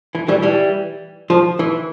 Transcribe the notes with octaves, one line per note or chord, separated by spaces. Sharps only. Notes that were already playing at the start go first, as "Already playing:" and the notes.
E3
E3 G3
E3 G3
F3
E3